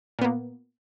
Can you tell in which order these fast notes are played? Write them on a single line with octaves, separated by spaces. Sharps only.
A#2 B3 A#3